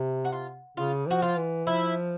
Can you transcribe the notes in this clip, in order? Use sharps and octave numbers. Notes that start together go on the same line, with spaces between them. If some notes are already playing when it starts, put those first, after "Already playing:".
Already playing: C3
F#4
F4
C#3 F4
F3 F#4
F4
E3
F3 E4